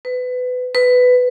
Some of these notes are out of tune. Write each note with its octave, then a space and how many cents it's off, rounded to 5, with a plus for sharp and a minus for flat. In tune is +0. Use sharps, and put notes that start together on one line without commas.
B4 +25
B4 +15